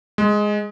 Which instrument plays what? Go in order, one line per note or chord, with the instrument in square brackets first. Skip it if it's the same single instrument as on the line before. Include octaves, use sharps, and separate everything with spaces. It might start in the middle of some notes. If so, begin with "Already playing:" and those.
[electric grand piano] G#3